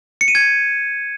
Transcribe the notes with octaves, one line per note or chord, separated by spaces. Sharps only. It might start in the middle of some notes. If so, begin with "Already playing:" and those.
C#7
D#7
G#6